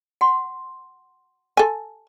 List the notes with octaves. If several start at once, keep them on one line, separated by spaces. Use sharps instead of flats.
F#5 C6
A4 G#5